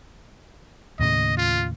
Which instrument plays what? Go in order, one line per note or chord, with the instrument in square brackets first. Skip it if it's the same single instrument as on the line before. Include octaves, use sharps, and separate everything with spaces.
[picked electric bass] D#2 A2 C#3 [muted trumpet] D#5
[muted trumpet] F4